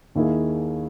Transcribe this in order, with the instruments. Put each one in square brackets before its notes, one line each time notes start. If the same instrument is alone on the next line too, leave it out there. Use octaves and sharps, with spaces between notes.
[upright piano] D#2 D#3 A#3 E4 G#4